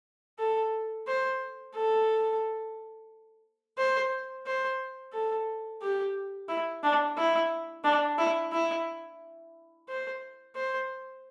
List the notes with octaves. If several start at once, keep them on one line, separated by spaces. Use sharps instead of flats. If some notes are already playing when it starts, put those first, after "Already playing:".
A4
C5
A4
C5
C5
A4
G4
E4
D4
E4
D4
E4
E4
C5
C5